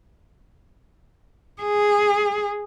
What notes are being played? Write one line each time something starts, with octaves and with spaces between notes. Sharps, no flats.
G#4